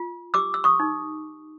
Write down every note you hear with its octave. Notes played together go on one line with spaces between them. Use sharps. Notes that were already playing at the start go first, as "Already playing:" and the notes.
Already playing: F4
G4 D6 E6
E6
C#6 D#6
D#4